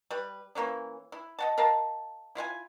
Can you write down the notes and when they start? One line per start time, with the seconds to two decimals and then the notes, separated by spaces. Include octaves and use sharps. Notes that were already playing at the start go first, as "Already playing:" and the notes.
0.11 G3 B4
0.55 E3 A#3 C#4 D4
1.12 E4
1.39 D#5 F#5 A5
1.58 A#4 D#5 F5 A5
2.35 E4 F4 F5 G#5